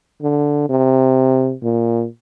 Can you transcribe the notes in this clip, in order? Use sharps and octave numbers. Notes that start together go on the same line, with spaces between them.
D3
C3
A#2